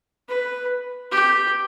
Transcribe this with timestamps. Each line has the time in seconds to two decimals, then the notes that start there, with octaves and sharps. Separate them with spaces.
0.29 B4
1.12 G4